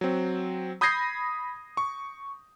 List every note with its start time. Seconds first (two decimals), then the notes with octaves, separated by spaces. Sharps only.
0.01 F#3 C4
0.81 B5 D#6 G6 G#6 A#6 C7
1.77 C#6